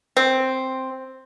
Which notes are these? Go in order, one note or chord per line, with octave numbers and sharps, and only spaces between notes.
C4